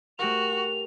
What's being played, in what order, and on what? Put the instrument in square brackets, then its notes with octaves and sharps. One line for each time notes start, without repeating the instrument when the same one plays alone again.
[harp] A3 G4 A#4 [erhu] F#4 [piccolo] F7